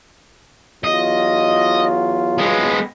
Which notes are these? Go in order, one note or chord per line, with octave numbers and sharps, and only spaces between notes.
E2 F#3 F4 D#5
G#3 B3